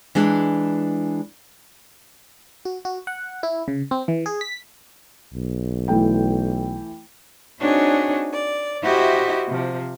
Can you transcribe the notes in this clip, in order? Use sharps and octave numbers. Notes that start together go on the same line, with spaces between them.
E3 G#3 D4
F#4
F#4
F#5
E4
C#3
C4
E3
G#4
B6
B1
E3 A3 G5
C4 D4 D#4 F#4 G#4 C#5
D5
E4 F#4 G4 C5 D#5 E5
C3 F3